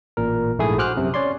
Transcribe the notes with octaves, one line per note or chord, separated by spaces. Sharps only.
A1 A#2 A#4
A#1 G#2 A3 E4 G#4 D#6
F#4 C5 D6 F6 F#6
F#2 C3
C#4 C#5 D5 C6